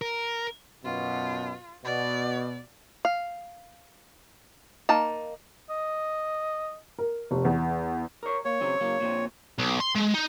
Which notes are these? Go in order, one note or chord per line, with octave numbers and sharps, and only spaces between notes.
A#4
F#2 B2 F4
B2 D5
F5
A#3 D#4 A5
D#5
A#4
F1
E2
A#4 C#5
A#3 C#5
C#3 F#3 C4
C#3 F#3 A#3
A#2 F3 C4
B1
C6
G#3
D#4